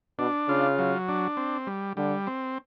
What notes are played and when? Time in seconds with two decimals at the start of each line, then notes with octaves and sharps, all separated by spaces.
0.18 B2 D4
0.48 C#3 F4
0.78 F#3
1.08 D4
1.37 C4
1.67 G3
1.97 D3 G3
2.27 C4